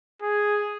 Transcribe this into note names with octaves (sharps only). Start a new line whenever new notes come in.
G#4